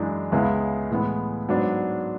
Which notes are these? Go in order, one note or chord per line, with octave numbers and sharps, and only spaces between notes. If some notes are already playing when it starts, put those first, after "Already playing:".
Already playing: F#2 E3 G#3 D4
C#2 C#3 G#3 B3 E4
A2 E3 G#3 B3
G#2 F#3 B3 D4